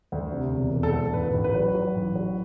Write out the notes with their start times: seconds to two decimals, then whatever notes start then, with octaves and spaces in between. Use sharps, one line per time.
0.12 D2
0.32 C3
0.53 E1
0.73 E1
0.83 A4
0.93 D2
1.14 A1 B4
1.34 A1
1.44 B4
1.55 F#3
1.75 F#3
1.95 A1
2.15 F#3